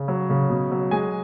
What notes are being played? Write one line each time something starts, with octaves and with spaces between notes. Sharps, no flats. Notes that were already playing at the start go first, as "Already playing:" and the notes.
Already playing: C#3
F#3
C#3
B2
F#3
G#3 G#5